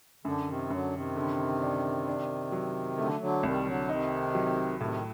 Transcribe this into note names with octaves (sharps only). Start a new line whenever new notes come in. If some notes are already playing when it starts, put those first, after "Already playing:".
F#2 D3
C3 D#3
F#2 D3 F#3
C3 D#3
D3
D4
D4
F#3
D3 A3
D3 F#3
C2 D#3 G3
D3 F#3
C3 D#3 D#4
F#3
A2 C3 D#3